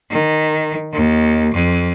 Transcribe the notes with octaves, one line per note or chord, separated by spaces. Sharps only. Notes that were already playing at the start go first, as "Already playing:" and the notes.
D#3
D#2
F2